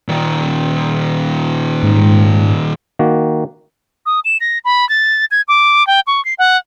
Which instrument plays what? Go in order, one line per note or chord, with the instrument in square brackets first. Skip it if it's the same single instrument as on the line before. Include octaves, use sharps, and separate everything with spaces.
[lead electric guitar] A#2 D#3
[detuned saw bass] G#2
[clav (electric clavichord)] D#3 A#3 F#4
[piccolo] D#6
E7
A#6
B5
A6
G#6
D6
G5
C#6
C7
F#5